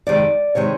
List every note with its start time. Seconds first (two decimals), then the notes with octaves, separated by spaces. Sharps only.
0.07 F2 C3 D#3 G#3 D5
0.55 C3 D#3 G#3 C#5